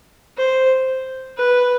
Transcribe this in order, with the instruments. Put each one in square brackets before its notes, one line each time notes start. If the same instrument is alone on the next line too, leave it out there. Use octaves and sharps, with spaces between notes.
[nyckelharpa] C5
B4